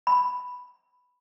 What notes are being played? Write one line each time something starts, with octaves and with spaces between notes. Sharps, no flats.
B5